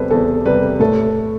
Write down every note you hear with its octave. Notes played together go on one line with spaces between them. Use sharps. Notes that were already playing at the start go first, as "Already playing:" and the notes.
Already playing: E2 C3 G3 A4 B4 C5
E2 A4
C3 G3 B4
A2 A4